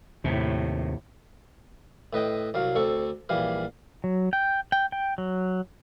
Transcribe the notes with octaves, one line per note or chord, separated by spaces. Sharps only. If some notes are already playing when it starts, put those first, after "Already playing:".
D#2 A2 C3
A2 B4 D#5 G5
C2 F#3 F5
D2 C4 A4 C#6
A#1 E3 G3 F5
F#3
G5
G5
G5
F#3